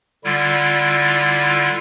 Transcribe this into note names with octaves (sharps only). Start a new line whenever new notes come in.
D3 G3 E4 F4